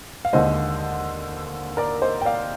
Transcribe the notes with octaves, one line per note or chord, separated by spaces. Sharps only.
F5
D#2 D3 G#3 C5 D#5
A#4 D5
C5 D#5
G5
D5 F5